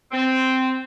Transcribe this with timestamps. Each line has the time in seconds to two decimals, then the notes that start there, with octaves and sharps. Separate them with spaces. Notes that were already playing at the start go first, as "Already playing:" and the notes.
0.11 C4